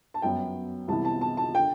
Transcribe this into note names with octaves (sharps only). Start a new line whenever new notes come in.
A5
G1 F#2 F#3 B3 G5
C2 C3 E3 B3 E4 A5
A5
A5
A5
D3 G5